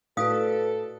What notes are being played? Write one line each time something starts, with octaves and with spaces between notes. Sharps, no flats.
A2 F#4 A4 B4 D5 F5 D#6